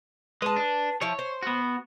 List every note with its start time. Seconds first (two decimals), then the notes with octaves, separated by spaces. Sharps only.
0.42 G#3 B4 A5
0.56 D4
1.01 F3 E4 C#5
1.19 C5
1.43 B3 F#4